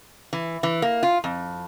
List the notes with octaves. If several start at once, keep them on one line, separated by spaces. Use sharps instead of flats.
E3
E3
A#3
F4
F2